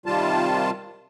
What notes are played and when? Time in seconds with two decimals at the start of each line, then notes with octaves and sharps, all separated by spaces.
0.06 C3 D#3 G3 F4 A5